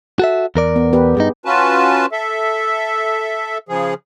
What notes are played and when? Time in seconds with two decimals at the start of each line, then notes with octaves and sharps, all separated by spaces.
0.19 F#4 A4 E5
0.56 E2 A#4 D5
0.76 B3
0.93 B3 G4 B4
1.17 G2 D#4 G#4
1.45 C#4 F4 F#4 B4 A5
2.12 A4 E5
3.69 C#3 F3 G#4